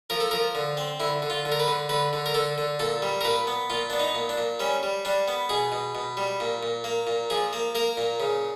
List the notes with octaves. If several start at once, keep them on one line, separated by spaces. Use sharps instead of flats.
F3 A#4
A4
F3 A#4
D3
C4
D3 E4
D3
F4
D3
A#4
B4
D3
D3 B4
D3
A#4
D3 A4
D3
A#2 A4
G3
A#4
A#2 B4
B3
A#2 F4
B3 D4
D#4
A#2
D4
A#2
G3 C#4
G3
G3 D4
B3
B2 G#4
B2
B2
G3
A#2
A#2
A#3
A#2
F3 G#4
A#3
A#3 A#4
A#2
C#3